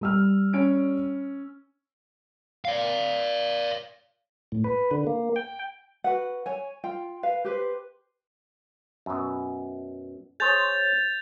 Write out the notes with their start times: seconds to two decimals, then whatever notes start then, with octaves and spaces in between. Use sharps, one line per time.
0.01 G3 E6 F6
0.53 C#4 D7
2.65 D5 F5
4.52 A2
4.64 B4
4.91 D3
5.07 A#3
5.36 G5
6.04 F#4 B4 F#5
6.46 C#5 G#5
6.84 F4 G5
7.23 B4 F5
7.45 G4 B4 C5
9.06 F#2 B2
10.40 G#4 C5 C#5 G6 A6 F7